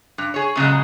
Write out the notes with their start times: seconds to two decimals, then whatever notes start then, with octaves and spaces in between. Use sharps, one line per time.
0.18 G2
0.34 G#4 C#5
0.56 A#2 C#3 F#3 G#3